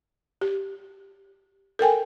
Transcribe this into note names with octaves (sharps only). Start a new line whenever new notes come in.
G4
A4 A#4 G5 G#5